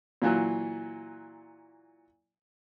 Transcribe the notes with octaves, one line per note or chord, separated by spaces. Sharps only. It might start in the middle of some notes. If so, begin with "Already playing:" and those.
A#2 E3 F#3